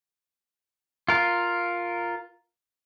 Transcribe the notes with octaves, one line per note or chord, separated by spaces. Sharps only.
F4 A#4